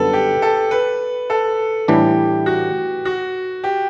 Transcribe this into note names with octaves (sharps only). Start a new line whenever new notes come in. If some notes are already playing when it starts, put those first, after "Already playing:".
Already playing: F#2 D3 G3 B3 A4 B4
G4
A4
B4
A4
A2 E3 G3 D4 G4
F#4
F#4
G4